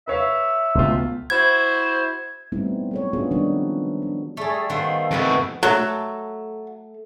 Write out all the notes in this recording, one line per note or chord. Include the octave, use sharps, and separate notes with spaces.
B4 C#5 E5 F5
E1 C#2 A3 B3 F4
E4 F#4 C5 G#6
G3 A3 B3 C4 D#4 E4
F#3 A4 C#5
B3 C#4 D4 F4 F#4 G#4
D#3 F3 G3 G#3 D4 D#4
D4
G3 A3 G#4 A4 D5
D#3 B3 A4 C5 F5
F2 A3 D#4 F#4 A4 B4
F#3 A3 A4